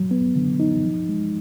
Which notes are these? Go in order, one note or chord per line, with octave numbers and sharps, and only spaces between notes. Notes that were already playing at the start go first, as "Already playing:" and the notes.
Already playing: F#3
B3
D3
D#4
F3
G#3